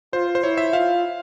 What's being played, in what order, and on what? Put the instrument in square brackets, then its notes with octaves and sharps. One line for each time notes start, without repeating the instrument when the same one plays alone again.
[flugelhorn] F4 [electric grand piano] C5
[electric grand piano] C5
[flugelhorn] E4 [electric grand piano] C#5
[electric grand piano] E5
[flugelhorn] F4 [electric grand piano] F5